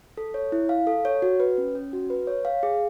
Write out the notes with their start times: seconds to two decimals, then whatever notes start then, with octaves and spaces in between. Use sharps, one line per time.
0.17 A4
0.34 C#5
0.52 E4
0.69 F5
0.87 A4
1.05 C#5
1.22 F#4
1.40 B4
1.58 C#4
1.75 C#4
1.93 F#4
2.10 B4
2.27 C#5
2.45 F5
2.63 G#4